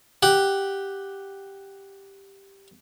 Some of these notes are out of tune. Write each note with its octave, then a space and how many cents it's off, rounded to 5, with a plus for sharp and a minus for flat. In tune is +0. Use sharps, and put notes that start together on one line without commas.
G4 +0 F#5 +0